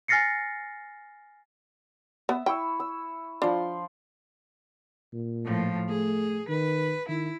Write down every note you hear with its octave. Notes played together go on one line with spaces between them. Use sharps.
G#5 F6 A6 A#6 C7 C#7
B3 E5
E4 G5 C#6 E6
E6
F3 D4 C6
A#2
A2 F3
A3 G#4
D#3 B4
D#3 E4